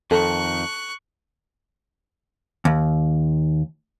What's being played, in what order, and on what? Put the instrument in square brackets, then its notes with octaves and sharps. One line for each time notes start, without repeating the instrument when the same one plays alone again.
[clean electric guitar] F2 D#3 [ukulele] A4 [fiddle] C#6 F#6
[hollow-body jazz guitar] D#2